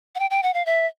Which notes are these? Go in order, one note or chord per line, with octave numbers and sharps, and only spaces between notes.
F#5
G5
G5
F#5
F5
E5